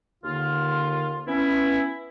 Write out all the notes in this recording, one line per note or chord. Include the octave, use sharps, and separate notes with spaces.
D#2 D3 F4
B3 C#4 E4